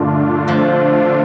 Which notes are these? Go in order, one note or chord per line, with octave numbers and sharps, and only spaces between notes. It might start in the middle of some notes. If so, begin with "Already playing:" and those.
Already playing: G2 A#2 D3 D#3 G3 A3 D4 F4
F2 F3